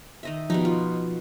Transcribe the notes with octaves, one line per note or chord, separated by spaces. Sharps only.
D#3 D#5 E5
B2 F3 G3 D#4
F4